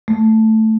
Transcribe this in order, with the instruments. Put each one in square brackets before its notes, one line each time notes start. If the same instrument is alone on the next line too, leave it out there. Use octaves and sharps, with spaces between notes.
[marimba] A3